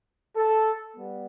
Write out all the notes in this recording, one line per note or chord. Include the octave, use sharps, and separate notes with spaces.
A4
G3 B3